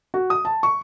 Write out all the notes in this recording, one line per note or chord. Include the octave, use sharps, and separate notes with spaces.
F#4
D#6
A5
C#6